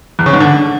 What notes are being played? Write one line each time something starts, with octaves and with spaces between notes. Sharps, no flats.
E2
C#3
G#2
D3